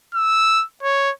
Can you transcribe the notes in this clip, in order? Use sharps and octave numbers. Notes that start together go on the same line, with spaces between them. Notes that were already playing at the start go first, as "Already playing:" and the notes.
E6
C#5